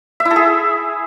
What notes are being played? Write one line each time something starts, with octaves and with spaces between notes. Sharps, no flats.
E5
E4
A4
G#4